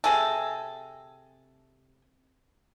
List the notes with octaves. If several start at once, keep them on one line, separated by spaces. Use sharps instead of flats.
C3 G#4 A4